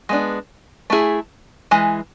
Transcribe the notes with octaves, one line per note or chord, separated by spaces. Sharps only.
G#3 B3 D4
A3 E4 G#4
E3 G#3